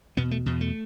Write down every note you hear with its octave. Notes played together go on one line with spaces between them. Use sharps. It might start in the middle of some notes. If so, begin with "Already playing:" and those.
E2 B2 B3
A3
E2 B2
A3